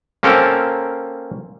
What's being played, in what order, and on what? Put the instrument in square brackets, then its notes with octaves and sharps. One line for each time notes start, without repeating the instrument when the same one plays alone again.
[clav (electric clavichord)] A#3 C4 C#4 A4 A#4